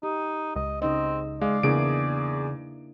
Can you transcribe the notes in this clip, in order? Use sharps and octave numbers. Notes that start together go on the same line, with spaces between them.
D#4 G4
C#2 D#5
C#3 C4 D#4 D#5
G#3 D5 F5
E2 C#3 A#3 D4 E4 G#4 D7